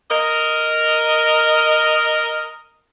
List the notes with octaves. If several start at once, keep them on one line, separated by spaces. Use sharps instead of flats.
A#4 D#5